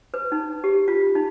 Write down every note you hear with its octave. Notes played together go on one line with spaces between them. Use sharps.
B4
D#4
G4
F4
D#4